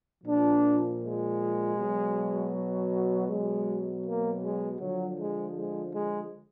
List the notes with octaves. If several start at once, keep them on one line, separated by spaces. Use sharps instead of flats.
A#2 F3 D4
G#3
B2 F#3
B2 F#3 G#3
A#3
G#3
D3 F3 F#3
G#3
G#3
G#3